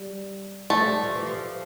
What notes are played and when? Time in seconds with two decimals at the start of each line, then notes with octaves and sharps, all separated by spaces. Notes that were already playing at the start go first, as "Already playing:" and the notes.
Already playing: G3
0.70 F3 A3
0.86 G3
1.03 F3
1.15 E3
1.26 F3